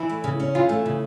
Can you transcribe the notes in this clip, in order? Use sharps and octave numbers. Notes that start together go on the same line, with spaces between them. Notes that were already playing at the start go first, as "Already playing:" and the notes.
Already playing: E3 E4
A3
C#3
C#4
E3 F4
A3
C#3